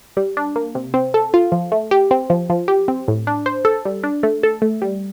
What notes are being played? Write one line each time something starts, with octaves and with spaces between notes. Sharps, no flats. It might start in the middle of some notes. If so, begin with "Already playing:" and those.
G3
D4
A#3
C3
C4
A4
F4
F3
A3
G4
C4
F3
F3
G4
C4
A2
D4
C5
A4
G3
D4
A3
A4
A3
G3